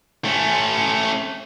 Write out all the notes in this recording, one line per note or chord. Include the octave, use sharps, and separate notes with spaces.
A3 C#4